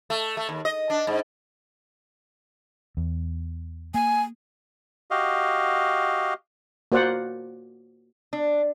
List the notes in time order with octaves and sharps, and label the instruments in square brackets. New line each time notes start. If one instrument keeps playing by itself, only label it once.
[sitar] A3
A3
D#2
D#5
D4
G#2
[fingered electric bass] E2
[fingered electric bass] A#3 [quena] G#5
[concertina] F#4 G4 D#5 F5
[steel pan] A#3 F#4 C5 D5 F#5
[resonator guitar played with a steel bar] D4